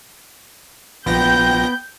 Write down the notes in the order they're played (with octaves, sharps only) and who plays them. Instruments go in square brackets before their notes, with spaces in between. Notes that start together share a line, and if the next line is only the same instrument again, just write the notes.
[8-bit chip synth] A#1 F3 A#6 [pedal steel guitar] B3 [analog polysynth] G5 [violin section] G6